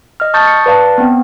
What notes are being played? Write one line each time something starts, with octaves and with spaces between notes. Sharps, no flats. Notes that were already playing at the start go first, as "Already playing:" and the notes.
D#5 F6
A5 C#6 D#6 G6 A6
C#7
B4 D5 F5 A5
B3 C4